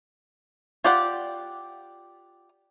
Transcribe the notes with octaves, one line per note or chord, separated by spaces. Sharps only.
F4 G4 D5 F#5